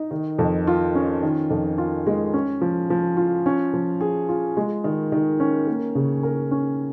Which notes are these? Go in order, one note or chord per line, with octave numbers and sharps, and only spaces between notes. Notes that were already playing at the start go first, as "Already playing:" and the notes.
Already playing: D#4
D#3
F2
F4
C#4
D#3
F2
F4
G#3
C#4
F3
F3
F4
C#4
F3
G#4
F4
G#3
D#3
D#3
C#4
A#3
C#3
A#4
C#4